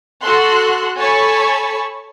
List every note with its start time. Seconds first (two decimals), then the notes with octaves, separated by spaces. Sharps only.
0.22 F#4 A4 C6 F#6
0.98 A4 C#5 G#5 A5 B5 C#6